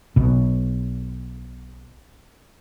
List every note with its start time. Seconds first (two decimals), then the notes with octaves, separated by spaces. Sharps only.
0.16 B1 B2